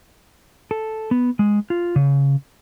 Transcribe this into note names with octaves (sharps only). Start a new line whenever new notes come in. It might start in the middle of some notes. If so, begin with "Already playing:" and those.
A4
B3
G#3
F4
C#3